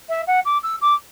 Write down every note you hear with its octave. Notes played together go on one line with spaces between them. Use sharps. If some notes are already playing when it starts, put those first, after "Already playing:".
E5
F#5
D6
E6
D6